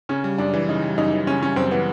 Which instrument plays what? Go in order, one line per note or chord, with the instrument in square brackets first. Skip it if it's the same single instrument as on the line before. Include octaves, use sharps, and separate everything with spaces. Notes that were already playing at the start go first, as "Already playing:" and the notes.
[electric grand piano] C#3 [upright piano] C#4
[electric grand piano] G3
[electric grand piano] F#2 [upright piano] D4
[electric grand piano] E3
[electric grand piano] C#3 [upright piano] D#4
[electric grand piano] G3
[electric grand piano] F#2 [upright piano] D#4
[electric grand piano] E3
[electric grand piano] C#3 [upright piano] C#4
[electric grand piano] G3 [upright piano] C#4
[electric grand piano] F#2 [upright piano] C4
[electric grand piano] E3 [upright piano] B3